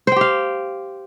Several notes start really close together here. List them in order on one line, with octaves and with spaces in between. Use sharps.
C5 G5 G4 F5